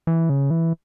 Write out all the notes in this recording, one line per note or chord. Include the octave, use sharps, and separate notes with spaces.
E3
C#3
E3